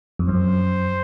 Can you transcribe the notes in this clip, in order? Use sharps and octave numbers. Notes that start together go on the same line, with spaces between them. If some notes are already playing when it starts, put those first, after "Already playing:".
F2
F#2 C5